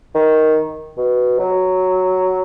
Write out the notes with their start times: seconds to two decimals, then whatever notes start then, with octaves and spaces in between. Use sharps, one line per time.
0.15 D#3
0.97 B2
1.38 F#3